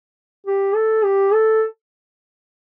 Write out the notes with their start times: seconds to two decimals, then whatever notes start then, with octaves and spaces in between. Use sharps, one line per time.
0.47 G4
0.76 A4
1.05 G4
1.34 A4